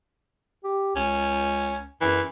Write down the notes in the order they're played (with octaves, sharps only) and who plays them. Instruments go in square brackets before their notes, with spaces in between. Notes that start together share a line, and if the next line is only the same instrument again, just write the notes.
[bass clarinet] G4
[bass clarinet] C#2 [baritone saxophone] C#4
[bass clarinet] F#2 [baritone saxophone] E3